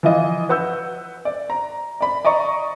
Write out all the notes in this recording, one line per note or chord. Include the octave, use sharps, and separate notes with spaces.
E3 F3 E4 F4 D#5
B4 F#5 E6 G6
D5
A#5
D5 B5
D5 D#5 A#5 C#6